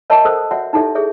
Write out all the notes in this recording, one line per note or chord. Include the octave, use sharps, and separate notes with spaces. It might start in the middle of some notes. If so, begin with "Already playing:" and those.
A#4 C#5 D#5 E5 A5 B5
A4 A#4 C5 F#5 D#6
F#4 C#5 E5 F#5
D#4 E4 G4 A4 C#5 E5
G#4 A4 C#5 E5